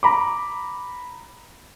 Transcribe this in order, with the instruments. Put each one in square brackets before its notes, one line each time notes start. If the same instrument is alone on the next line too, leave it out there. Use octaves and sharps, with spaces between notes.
[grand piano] A#5 B5 D6